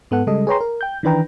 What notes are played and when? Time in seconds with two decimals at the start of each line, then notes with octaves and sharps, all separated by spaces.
0.11 G#2 B3 A4 F#5
0.27 C#3 G3 G#3 A4 D#5
0.47 G#4 B4 C#5 G5 A#5 C6
0.61 A#4
0.81 G5 G6
1.03 D#3 E3 D4 B4 G5 A#5